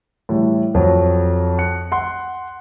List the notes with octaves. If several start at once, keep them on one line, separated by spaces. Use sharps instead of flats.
A2 E3 G3
F2 F#3
F#6 C#7
F#5 C6